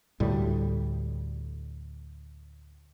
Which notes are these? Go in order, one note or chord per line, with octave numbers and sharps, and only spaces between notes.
D2 A2 G3